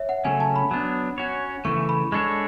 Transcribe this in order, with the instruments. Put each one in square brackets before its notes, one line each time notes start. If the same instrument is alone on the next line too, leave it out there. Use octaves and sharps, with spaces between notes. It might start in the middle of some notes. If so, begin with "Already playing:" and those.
Already playing: [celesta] C#5 E5
F#5
[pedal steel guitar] C#3 F#3 A3 C#4 [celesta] G#5
[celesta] A5
B5
[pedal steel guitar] F#3 B3 D4
C#4 F#4 C#5
[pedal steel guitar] C#3 E3 A3 [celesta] C#6
[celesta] B5
[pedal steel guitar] G#3 D4 A4 C#5 [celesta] C#6